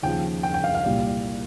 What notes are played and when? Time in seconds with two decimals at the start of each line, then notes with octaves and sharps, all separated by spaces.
0.03 D#2 C#3 F3 G5
0.43 G5
0.54 G5
0.64 F5
0.75 F5
0.85 C2 A#2 G3